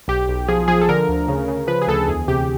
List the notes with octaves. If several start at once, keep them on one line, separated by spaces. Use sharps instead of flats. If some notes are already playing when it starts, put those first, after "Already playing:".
B1 G4
B1
F3 G#4
F3 G#4
A4
D3 A#4
D2
C#3
C#3
F3 B4
G#4
D2 A4
E2 G#4
C3 G4